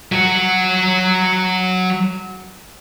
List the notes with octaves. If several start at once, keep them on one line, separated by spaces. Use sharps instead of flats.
F#3 F#4